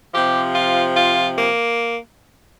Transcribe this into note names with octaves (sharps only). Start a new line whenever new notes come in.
C3 F3 G4
F4
F4
A#3